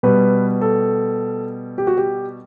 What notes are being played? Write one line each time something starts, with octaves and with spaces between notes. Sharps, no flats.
B2 G3 B4
A4
G4
F#4
G4